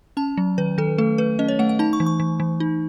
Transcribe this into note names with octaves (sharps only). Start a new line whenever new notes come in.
C#4 A5
F#3
D#3 B4
D#3 A4
A3 A4
A3 B4
C#4 D#5
C#5
A3 F#5
F#5
D#4 A5
C#6
E3
C#6
E3
E3
D#4